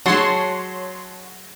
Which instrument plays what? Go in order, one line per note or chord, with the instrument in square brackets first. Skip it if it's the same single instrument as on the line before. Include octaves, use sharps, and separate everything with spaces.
[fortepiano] F#3 G#3 [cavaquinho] F#4 [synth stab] C#5 A5 C6